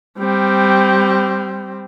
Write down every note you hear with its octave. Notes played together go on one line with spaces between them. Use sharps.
G3 C4